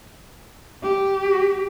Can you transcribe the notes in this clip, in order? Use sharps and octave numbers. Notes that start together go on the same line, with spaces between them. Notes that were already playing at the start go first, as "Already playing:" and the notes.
G4